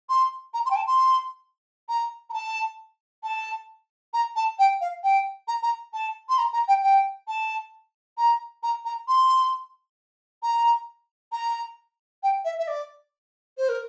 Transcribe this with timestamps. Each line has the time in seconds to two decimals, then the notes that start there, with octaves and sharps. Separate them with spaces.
0.09 C6
0.54 A#5
0.66 C6
0.71 G5
0.76 A5
0.87 C6
1.89 A#5
2.30 A#5
2.33 A5
3.23 A5
4.14 A#5
4.36 A5
4.59 G5
4.81 F5
5.04 G5
5.48 A#5
5.63 A#5
5.93 A5
6.29 C6
6.38 A#5
6.53 A#5
6.68 G5
6.83 G5
7.28 A5
8.18 A#5
8.63 A#5
8.85 A#5
9.08 C6
10.43 A#5
11.32 A#5
12.23 G5
12.45 E5
12.59 E5
12.68 D5
13.58 C5
13.69 A#4